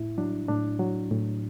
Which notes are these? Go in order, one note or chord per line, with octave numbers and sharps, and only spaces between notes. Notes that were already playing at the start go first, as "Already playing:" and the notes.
Already playing: A2 E4
F#3 D4
A2 D4
F#3
A2